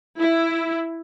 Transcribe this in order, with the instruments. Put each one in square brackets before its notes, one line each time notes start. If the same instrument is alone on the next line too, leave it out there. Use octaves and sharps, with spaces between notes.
[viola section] E4